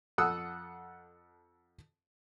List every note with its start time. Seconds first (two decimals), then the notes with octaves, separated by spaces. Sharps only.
0.18 F2 A4 F#5 D#6 E6 F#6